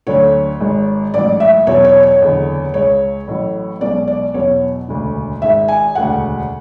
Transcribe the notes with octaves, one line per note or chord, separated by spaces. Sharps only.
D2 D3 F#3 C#5
G#1 G#2 G#3
A1 G#2 F#3 D5
E5
E2 B2 F#3 C#5
C#5
C#5
F#1 E2 D3
C#2 C#3 G#3 C#5
A1 A2 F#3
B1 B2 G#3 D5
D5
E2 B2 F#3 C#5
E1 D2 C#3
G#1 G#2 G#3 E5
G#5
E1 D2 C#3 F#5